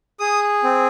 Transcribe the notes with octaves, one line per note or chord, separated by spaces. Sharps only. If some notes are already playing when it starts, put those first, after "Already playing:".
G#4 D#6
C4